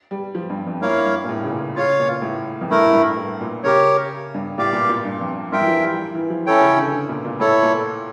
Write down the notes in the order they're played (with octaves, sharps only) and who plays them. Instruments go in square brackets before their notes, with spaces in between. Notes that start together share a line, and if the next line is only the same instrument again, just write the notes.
[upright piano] G3
F3
G2
F2
[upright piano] G2 [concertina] A#3 E4 A#4 C#5 F5
[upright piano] G2
A#2
A2
C#3
A#2
[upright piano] C#3 [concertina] F4 C#5 F5
[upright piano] A#2
A2
F2
[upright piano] G2 [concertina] A3 E4 A#4
[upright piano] A2
G2
A2
A#2
[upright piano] C#3 [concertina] G4 A#4 C#5
[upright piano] G2
[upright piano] A2 [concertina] G4 D5 F5
[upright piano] A#2
A#2
G2
F2
[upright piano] G2 [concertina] F4 A#4 E5 G5
[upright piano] E3
F3
G3
E3
F3
[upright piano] E3 [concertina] C#4 E4 A4 C#5 G5
[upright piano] C#3
D3
D3
A#2
A#2
[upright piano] A2 [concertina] E4 A4 C#5
[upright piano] A#2